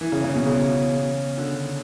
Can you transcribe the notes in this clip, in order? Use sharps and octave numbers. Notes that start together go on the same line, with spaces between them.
E3
C#3
C#3
B2
C#3
D3